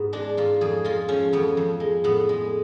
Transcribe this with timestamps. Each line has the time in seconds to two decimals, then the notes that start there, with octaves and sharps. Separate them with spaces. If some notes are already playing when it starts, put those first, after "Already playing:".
Already playing: G#2 B3
0.13 G#3 D4
0.37 G#2 F4
0.61 F2 G#4
0.85 G#3 F4
1.08 F3 C#4
1.33 F2 B3
1.57 F2
1.80 G#3
2.04 A2 B3
2.29 G#3